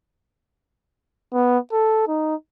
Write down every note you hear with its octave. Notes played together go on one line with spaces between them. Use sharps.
B3
A4
D#4